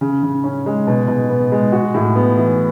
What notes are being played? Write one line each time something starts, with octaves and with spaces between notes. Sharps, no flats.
C#3
C#3
C#4
G#3
B2
B2
B3
G#3
F#4
A2
B3
E3